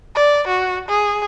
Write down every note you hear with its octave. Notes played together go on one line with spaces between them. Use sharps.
D5
F#4
G#4